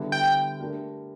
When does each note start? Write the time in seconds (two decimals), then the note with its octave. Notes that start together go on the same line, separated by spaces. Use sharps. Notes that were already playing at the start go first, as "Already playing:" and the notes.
Already playing: D3 G3 B3 E4
0.12 G5
0.60 A3 D4 G4 A#4